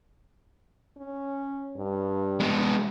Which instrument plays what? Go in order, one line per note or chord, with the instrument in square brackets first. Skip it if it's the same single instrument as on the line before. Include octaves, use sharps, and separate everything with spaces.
[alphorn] C#4
G2
[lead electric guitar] G#3 B3